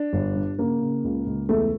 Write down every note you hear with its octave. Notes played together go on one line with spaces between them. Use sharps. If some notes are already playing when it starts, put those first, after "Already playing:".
Already playing: D4
G1
G2
C#3 A#3
C#3
C#2
C#2
E2 A3